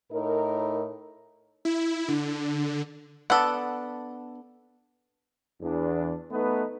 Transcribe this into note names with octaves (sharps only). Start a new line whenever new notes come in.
A2 D#4 A#4
E4
D3
B3 D4 A4 F#5
E2 D4
A3 B3 D#4 B4